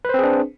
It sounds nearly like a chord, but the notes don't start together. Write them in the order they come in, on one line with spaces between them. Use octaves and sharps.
B4 C5 C4 G#4 D4